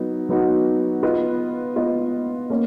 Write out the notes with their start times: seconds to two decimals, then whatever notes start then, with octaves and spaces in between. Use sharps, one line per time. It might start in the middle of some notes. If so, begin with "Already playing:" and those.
Already playing: F#3 B3 D#4 F#4
0.29 F#3 B3 D#4 F#4
1.03 B3 F4 B4 D#5
1.76 B3 F4 B4 D#5
2.50 A#3 C#4